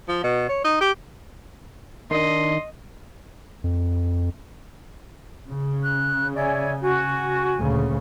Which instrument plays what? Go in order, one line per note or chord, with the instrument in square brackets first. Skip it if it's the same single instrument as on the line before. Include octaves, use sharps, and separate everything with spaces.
[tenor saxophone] F3
B2
C#5
D#4
G4
[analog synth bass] D#3 [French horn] D4 [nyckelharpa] D#5 [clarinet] C6
[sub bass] F2
[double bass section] C#3
[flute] F#6
[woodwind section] C#5 D5 G#5 [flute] E5
[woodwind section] F#4 [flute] G#5
[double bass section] D2 A#2 C#3